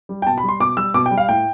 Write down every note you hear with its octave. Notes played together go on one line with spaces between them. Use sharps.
G3
G5
B2 A5
B5
G3
C6
B2 D6
G3 E6
B2 D6
G5
G3
F5
A2 G5